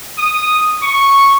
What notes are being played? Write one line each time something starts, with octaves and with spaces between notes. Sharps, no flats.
D#6
C#6